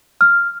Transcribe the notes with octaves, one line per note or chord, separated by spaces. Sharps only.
F6